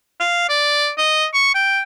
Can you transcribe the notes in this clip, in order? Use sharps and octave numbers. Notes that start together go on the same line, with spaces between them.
F5
D5
D#5
C#6
G5